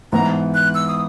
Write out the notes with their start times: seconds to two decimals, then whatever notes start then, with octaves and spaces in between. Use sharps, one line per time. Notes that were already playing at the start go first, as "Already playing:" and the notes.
0.12 G#2 E3 B3 A#5
0.54 F#6
0.75 E6
0.88 D#6